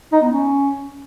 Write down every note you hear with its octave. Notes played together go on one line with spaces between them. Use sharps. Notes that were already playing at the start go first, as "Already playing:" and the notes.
D#4
B3
C#4